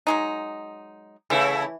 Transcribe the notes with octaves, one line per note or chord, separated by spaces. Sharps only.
F#3 G#3 D#4
C#3 E3 A3 E4